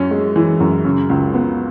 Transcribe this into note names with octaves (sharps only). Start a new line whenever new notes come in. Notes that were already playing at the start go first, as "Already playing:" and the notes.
Already playing: F#2 C#4
G#3
E3
F#2
C#3
C#2
B3